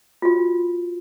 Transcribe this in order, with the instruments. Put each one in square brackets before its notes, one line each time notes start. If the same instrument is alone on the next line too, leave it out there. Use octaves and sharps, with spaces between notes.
[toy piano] F4 F#4